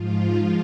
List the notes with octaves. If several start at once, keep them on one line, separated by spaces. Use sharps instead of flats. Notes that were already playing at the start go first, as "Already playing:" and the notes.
Already playing: G#2 F3 F4